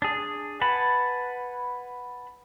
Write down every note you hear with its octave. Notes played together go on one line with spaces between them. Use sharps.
D4 G#4
B4 F#5 G#5 A5 B5